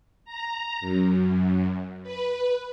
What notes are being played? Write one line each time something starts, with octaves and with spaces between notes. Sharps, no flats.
A#5
F#2
B4